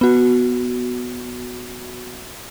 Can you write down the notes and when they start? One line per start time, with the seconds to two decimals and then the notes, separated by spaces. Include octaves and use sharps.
0.01 B3 F#4